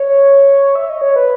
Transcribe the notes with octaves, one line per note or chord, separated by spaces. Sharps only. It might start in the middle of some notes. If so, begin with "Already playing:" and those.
Already playing: C#5
E5
D#5
C#5
B4